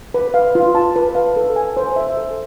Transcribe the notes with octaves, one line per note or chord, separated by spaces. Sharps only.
B4
F5
F4
A5
B4
F5
A4
G#5
C5
E5
A4